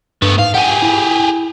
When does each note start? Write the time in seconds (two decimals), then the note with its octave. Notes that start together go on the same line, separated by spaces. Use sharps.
0.22 G2 A3 B3
0.39 G#2 F5
0.55 G4 G#4 F#5
0.82 E4